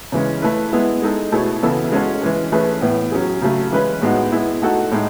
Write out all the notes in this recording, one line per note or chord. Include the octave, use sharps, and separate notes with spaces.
C#3 E3 G#3 C#4
A3 E4 B4
G#3 B3 E4
G#3 D#4 A4
B2 A3 E4 G#4 C#5
C#3 E3 B3 E4 A4
G#3 C#4 F#4 A4 C#5
E3 G#3 C#4
E3 A3 C#4 G#4 B4
A2 E3 B3
F#3 C#4 G#4
C#3 F#3 A3
E3 G#3 C#4 E4 B4
A2 G#3 B3 D#4 F#4
G#3 B3 E4
A3 D#4 F#4 A4
A2 G#3 D#4